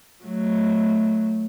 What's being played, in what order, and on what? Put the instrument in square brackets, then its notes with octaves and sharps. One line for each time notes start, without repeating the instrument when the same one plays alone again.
[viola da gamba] F#3 A3